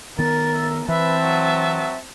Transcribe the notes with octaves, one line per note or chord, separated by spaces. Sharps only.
D#3 B3 A#4 A6
E5
E3 C4 B4 E5 A5
F#3